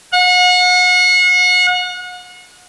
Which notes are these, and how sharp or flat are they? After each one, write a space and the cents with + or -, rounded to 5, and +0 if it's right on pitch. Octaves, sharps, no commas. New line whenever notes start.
F#5 -35